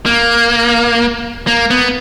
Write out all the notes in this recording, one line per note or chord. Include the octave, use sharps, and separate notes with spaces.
A#3
A#3
B3